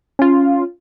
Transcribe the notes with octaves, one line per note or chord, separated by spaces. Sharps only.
C#4 F4